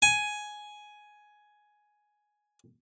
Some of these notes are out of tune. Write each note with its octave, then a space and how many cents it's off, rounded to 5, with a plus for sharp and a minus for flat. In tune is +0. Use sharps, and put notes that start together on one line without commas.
G#5 +10